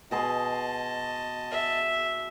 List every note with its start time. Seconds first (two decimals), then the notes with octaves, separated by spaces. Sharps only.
0.11 B2 G#4 D#5 A5 C6
1.51 E5